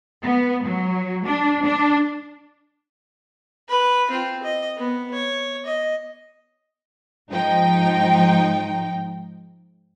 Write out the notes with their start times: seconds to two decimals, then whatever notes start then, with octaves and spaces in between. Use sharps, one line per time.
0.23 B3
0.65 F#3
1.26 D4
1.63 D4
3.69 B4 B5
4.10 C4 F4
4.43 D#5
4.77 B3
5.13 C#5
5.66 D#5
7.30 G#2 F3 D#4 G5